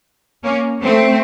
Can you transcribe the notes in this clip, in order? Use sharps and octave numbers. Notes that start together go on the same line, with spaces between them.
A#3 C#4
A3 C4